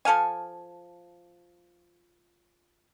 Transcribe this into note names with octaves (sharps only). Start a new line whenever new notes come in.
F3 A4 F5 G#5